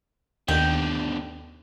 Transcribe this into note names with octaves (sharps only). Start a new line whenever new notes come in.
D#2 B2 D3 G5